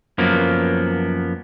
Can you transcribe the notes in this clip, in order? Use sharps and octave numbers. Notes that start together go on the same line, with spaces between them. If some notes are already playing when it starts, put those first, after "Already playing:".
F#2 F3 F#3 A#3 B3